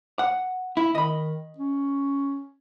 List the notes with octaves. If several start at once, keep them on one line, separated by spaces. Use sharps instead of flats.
F#5
E4
D#3 D#5 B5
C#4